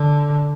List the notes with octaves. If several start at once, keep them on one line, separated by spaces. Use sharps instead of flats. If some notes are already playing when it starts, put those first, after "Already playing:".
Already playing: D3